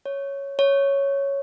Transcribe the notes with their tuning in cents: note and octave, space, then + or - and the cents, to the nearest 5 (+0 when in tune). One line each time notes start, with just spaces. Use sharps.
C#5 +0
C#5 +0